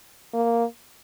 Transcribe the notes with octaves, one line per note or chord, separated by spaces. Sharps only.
A#3